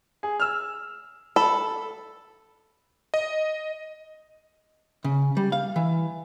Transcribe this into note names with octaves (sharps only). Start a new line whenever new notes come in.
G#4
E6 F6
A4 B5
D#5
C#3
G3
F5
E3